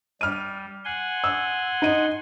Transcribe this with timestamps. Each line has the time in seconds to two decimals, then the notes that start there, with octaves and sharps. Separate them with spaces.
0.21 G3 F6 D#7
0.85 F#5 G#5 C6
1.24 E6
1.82 D#4 D#7